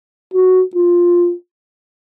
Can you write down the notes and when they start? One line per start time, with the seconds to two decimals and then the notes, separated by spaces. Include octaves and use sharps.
0.34 F#4
0.75 F4